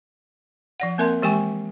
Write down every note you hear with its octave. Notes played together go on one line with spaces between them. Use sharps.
F3 D5 F#5
A#3 C4 A#4 E5 A5 C6
E3 G#3 G4 G5 G#5 C#6